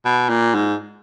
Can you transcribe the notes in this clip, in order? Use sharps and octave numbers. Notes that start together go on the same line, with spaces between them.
B2
A#2
G#2